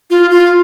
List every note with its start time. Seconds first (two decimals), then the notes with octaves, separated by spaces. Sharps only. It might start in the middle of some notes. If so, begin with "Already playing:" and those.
0.10 F4
0.31 F4